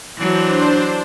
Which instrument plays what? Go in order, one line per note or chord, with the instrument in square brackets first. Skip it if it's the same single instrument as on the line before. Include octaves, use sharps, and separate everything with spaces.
[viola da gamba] E3 F#3 [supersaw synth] D4 C5